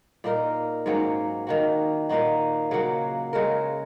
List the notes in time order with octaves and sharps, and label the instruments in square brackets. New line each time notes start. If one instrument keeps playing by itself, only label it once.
[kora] A#2 A#3 D#4 A#4
G#2 F#3 A#3 C#4
D#3 A#3 F#4
A#2 A#3 D#4 F#4
C#3 F#3 A#3 F#4
C#3 G#3 F#4 A#4